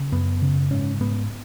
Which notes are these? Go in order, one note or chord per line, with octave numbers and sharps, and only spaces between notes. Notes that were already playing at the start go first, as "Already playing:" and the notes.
Already playing: C#3
F#2 B3
C#3
G#2 C#4
G#2 B3